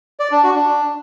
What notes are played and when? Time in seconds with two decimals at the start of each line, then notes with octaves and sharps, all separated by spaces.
0.20 D5
0.31 D4
0.43 F#4
0.55 D4